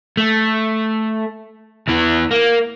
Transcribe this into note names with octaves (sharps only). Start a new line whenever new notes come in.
A3
E2 E3
A#3